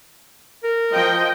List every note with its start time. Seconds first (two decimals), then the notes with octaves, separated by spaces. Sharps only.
0.64 A#4
0.92 F3 D#5 G5